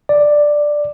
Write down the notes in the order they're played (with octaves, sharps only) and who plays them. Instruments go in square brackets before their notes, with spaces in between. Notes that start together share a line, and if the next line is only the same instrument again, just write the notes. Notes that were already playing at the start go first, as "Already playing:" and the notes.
[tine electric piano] D5